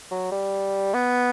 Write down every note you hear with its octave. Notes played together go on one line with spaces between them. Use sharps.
F#3
G3
B3